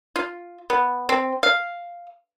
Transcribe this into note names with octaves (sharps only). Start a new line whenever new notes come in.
F4
B3
C4
F5